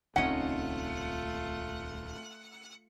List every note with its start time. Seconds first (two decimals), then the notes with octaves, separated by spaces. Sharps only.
0.16 D#1 C#2 A3 C4 C#4 D#4 F4 F#5